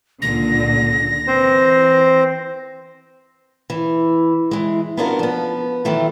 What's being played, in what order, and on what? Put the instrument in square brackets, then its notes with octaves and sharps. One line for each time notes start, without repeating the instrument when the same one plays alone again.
[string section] C#2 A#2 D3 [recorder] A#6
[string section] E3 [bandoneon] C4 C5
[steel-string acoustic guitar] E3
E3 G#3
B3 C#4 D4 F4 F#4 A#4
F3 B3
D#3 E3 F#3 A3